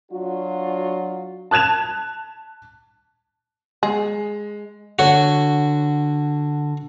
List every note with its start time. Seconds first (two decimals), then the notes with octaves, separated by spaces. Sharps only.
0.12 F#3 D4 F4 F#4
1.51 A5 F#6 G#6 E7 F7
3.83 G#3 G#4
4.99 D3 F#4 C#5